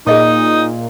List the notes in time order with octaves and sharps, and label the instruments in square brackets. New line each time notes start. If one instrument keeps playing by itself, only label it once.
[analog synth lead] A#2 [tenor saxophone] D#4 [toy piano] G#4 D#5 C#6